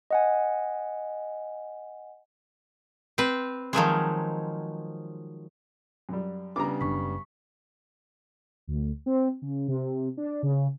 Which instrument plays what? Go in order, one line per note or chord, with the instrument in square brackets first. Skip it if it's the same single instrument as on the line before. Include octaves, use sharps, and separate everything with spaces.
[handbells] D#5 F#5 G#5
[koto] C4 B4
D#3 F3 F#3 G#3
[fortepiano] F#2 G3
[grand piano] C#3 G3 B3 [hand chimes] D4 [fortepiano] A#5 D6
[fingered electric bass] F#1 B2 D4 [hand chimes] C#6 B6
[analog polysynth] D2
C4
C#3
C3
D4
C#3